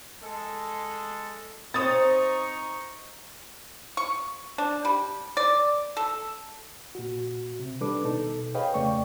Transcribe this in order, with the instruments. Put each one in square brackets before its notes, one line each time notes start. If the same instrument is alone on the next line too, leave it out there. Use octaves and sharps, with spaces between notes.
[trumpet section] G#3 A4
[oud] C4 C#5 [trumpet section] D#4 A#5 C#6 [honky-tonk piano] D#6 A6
[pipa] C#6
D4
G3
D5
A4
[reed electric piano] A#2 F#4
C3
D#3 G3 D4 A4 B4 D6
B2 D#4 A4
G#4 B4 C#5 D#5 F5 G5
E2 C#3 A3 D5 G5 C#6